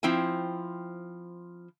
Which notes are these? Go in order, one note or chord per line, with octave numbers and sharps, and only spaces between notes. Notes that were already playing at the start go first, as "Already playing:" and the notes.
F3 C4 E4 G5 G#5